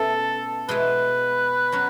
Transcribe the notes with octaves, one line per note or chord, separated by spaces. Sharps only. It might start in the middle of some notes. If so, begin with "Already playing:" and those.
Already playing: B2 A3 C#4 E4 A4
B2 G#3 B3 E4 B4
F#3 C#4